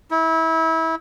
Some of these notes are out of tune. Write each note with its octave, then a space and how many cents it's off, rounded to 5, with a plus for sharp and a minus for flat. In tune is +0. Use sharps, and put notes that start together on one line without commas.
E4 -25